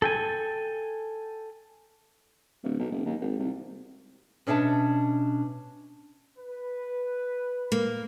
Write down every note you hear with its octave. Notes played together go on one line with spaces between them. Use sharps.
A4 G5 G#5
D1
B1
F#1
D#2
G#1
C2
B2 C#4 D4 E5 G#5 A5
B4
A#3